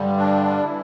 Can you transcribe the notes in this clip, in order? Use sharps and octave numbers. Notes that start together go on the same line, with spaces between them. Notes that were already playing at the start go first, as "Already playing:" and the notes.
Already playing: G2 D3 G3
D4
E3 G3 E4